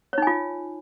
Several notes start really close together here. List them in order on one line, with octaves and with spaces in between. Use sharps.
C#5 D#4 G#5 F4